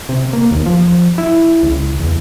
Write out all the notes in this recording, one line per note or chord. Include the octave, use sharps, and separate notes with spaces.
C3
A#3
D#2
F3
E4
C#2
E2